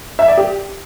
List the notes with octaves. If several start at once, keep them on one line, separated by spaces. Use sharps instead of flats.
E5
D5
G4